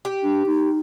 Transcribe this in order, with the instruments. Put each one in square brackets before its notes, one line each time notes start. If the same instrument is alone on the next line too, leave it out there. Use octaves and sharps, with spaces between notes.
[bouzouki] G4
[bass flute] D4
D#4